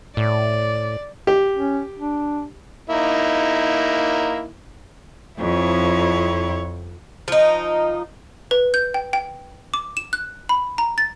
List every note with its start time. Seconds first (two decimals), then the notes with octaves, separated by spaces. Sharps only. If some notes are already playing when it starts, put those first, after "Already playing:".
0.17 A2 D5
1.27 G4
1.55 C#4
1.98 D4
2.90 A#3 D#4 E4
5.41 F2 E4 C#5
7.28 F3 D#4
8.51 B4
8.74 G6
8.94 G5
9.13 G5
9.74 D6
9.97 E7
10.13 F#6
10.49 B5
10.78 A#5
10.98 A6